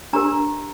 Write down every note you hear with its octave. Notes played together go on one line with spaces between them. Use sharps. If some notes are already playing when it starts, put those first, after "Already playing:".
D4 G4 A#4 A#5